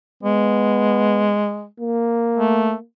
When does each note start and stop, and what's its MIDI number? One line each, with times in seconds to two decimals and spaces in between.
0.23 1.66 56
0.23 1.40 59
1.80 2.83 58
2.36 2.73 57